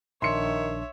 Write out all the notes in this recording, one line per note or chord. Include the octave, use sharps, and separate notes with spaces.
A#1 D#3 D4 C#5 E5 C6 C#7